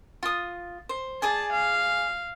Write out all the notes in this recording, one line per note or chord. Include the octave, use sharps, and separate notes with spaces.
F4 D#6
C5
G#4 D5 G#5 A5
F5